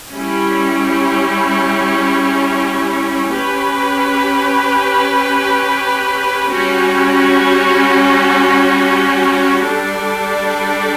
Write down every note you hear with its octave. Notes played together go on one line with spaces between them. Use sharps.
G3 C#4 E4
C#4 G4 B4
G3 C#4 F#4
G3 D4 A4 D5